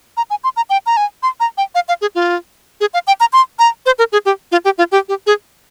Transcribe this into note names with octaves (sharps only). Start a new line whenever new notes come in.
A#5
G#5
C6
A#5
G5
A#5
G#5
C6
A#5
G5
F5
F5
G#4
F4
G#4
F5
G5
A#5
C6
A#5
C5
A#4
G#4
G4
F4
G4
F4
G4
G4
G#4